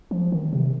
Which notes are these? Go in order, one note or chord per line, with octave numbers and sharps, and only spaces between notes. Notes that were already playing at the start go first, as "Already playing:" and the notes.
F3
D#3
C3